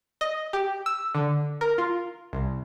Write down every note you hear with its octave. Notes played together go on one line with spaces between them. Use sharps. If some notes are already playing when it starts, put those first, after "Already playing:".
D#5
G4
E6
D3
A#4
F4
C2